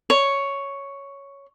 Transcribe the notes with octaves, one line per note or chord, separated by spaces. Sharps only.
C#5